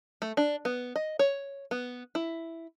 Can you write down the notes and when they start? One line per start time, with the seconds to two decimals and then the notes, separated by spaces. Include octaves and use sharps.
0.22 A3
0.37 D4
0.65 B3
0.96 D#5
1.19 C#5
1.71 B3
2.15 E4